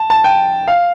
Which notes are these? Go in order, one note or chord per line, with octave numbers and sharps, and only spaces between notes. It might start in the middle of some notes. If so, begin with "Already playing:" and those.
Already playing: A5
A5
G5
F5